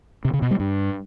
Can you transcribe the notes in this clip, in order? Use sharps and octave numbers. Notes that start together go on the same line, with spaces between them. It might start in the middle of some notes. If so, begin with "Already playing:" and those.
C3
C#3
B2
G3
G2